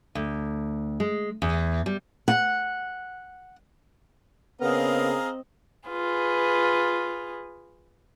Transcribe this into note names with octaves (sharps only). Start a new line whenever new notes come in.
D2
G#3
E2
G3
F#5
C#3 B3 C4 G#4 A#4 D#5 F5 A#5
F4 G#4 B4